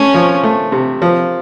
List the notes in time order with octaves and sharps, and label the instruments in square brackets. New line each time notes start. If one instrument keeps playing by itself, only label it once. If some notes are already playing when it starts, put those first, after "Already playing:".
Already playing: [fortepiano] A3 [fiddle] C#4
[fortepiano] F3
A3
C3
F3